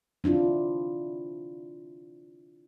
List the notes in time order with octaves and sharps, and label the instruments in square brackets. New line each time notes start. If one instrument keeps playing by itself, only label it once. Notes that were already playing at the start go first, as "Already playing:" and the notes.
[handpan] C4 D4 E4 F4